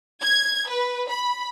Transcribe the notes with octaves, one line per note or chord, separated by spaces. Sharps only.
G#6
B4
B5